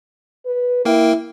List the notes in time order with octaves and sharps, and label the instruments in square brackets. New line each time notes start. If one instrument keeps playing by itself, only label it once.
[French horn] B4
[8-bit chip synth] A#3 A#4 G5 [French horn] E4